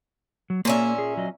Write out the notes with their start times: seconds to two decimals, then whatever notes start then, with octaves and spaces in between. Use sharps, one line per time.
0.50 F#3
0.65 A#2 A#3 C#4 G#4 E5
0.98 G#4
1.17 F#3 D#5